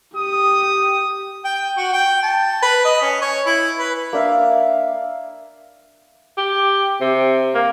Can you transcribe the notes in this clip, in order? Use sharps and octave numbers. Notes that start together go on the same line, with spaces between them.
G4 D#6
G5
F#4
G5
A5
B4
D#5
C#4
C#5
E4
B4
A#3 D4 E5 F5
G4
C3
A#3